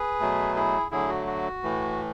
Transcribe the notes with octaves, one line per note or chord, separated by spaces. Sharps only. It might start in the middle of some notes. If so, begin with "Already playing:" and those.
Already playing: G#4 B4
B2 F#3 A3
E4 G#4
D3 F#3 A3 E4 G#4
F#4
F#4
A2 E3 A3